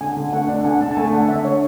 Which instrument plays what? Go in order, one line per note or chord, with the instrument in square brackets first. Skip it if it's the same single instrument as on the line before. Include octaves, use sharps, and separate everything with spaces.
[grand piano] D3 [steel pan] G#5
[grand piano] D3
[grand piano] A3 [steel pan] F#5
[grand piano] D4
[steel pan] F#5
[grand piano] D3 [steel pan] G#5
[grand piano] D3 [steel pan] A5
[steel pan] A5
[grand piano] A3 [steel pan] G#5
[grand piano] D4 [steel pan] F#5
[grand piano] D3 [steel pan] E5
[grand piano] D3 [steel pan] C#5